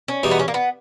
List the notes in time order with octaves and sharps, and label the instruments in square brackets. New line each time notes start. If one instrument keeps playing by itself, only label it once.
[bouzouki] C#4
[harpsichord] E2 B2 G3 [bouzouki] D#4
[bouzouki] B3
C#4
A#3
B3